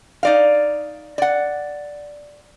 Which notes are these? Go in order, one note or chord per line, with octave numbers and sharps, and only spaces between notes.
D#4 D5 F5
D5 F#5